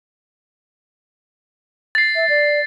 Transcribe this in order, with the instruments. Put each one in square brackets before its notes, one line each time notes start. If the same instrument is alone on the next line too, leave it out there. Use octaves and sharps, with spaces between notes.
[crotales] A6 C7
[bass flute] E5
D5